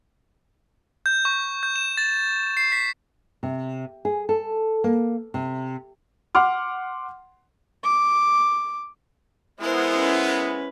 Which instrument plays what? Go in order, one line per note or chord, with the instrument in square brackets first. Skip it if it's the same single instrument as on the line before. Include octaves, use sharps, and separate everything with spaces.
[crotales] G6
C#6
G6
E7
A6
C7
B6
[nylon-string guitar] C3
G#4
A4
A#3
C3
[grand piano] F#5 C6 D6 F6
[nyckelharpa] D6
[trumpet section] G#3 B3 [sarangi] E4 [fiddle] A#4 C5
[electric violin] C#4 B4